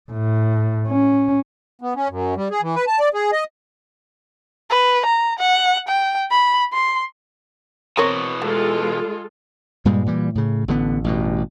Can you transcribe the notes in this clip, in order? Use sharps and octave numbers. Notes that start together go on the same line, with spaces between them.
A2
C#4
B3
C#4
F#2
G3
G#4
E3
B4
A5
D5
G#4
D#5
B4
A#5
F#5
G5
B5
C6
B2 E3 C4 A#4 C#5
G#3 A3 F4 A4
G2 A#2 G3 G#3
A#2 E3 G3
A2 C#3
A1 D3 B3
A1 G2 B2